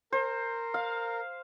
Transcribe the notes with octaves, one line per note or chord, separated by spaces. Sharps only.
A#4 C5
F5